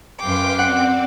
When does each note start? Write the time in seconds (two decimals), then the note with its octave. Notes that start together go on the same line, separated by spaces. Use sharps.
0.19 F#2 B4 F5 G5 C6 D6
0.59 C4 D5 F#5